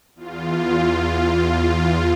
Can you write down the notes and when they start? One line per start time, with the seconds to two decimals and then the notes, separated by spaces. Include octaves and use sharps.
0.16 E2 F4